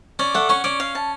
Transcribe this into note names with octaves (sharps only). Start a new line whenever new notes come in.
C#4 D5
A3 F#5
C#4 C#6
C#4 D5
F5
A5